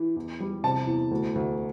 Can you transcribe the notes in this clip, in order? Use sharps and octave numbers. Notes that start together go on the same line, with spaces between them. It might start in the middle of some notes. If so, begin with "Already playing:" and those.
Already playing: E3
E2
G3
C3 A5
E2
D2
D2